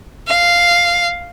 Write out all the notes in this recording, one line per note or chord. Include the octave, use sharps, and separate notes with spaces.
F5